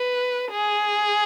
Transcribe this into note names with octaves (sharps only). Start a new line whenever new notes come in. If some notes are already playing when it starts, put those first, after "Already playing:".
Already playing: B4
G#4